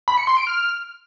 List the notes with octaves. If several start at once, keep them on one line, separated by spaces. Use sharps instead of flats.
B5
C#7
C6
D7
F6